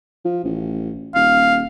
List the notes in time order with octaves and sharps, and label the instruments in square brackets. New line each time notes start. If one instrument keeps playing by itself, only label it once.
[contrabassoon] F3
A1
[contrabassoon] D#1 [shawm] F5